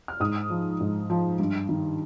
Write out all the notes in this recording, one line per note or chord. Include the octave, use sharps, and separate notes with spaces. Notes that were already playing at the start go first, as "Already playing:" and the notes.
F6
G#2 D#6
F3
G#2
F3
G2
D#3